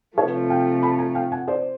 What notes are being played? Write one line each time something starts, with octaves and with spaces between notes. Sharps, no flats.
C3 F3 A3 B4 C#5
F5 G5
A5 B5
G#5 A#5
F5 G5
F#5 G#5
C5 D5